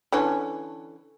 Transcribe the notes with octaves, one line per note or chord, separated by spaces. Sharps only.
D3 E3 C#4